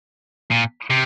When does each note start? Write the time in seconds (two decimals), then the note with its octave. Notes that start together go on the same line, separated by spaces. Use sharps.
0.51 A#2
0.90 C3